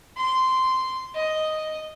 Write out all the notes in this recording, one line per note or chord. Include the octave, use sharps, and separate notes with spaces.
C6
D#5